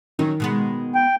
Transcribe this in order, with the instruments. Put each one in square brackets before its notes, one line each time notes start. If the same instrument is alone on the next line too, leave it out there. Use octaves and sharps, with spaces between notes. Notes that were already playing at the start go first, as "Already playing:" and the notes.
[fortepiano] D#3 [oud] F#3 C#4 D#4
[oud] B2 G#3 B3
[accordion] G5